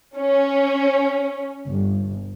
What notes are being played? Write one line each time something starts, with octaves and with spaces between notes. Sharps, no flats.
C#4
G1